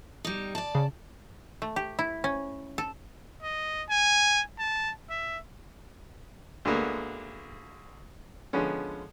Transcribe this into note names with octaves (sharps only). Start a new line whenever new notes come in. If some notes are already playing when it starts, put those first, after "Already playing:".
G3 D#4
D5 A5
C#3
A3
G4
E4
C#4
A4
D#5
G#5
A5
E5
D2 D3 G#3 A#3 B3
D3 F3 G#3 B3 C#4